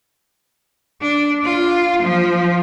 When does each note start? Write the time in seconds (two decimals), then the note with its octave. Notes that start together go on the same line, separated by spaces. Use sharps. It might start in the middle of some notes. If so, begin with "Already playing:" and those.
1.01 D4
1.44 F4
2.03 F3